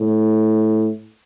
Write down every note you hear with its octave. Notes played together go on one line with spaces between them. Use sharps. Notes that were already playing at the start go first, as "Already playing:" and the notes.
Already playing: A2